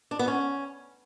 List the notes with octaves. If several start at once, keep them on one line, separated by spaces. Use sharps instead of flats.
D4
B3
C#4